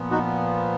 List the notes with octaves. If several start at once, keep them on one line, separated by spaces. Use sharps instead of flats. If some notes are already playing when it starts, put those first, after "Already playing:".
Already playing: A#2 F3 B3
D#4 F#4